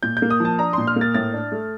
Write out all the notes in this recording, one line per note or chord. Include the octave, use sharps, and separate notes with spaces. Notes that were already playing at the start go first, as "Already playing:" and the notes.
A#2 G6
G6
A#3
D#6
F3 A5
D4 A#5
A#2 C6
F6
A#3
A6
A2 A6
D4
A3